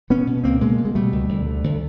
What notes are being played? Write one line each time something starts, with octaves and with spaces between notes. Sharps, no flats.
B2 B3 C#4
B2
C#2 A#3 C4
B2 G#3 A#3
B2
G#3
B2 G3 A3
C#2
D2
D3
D2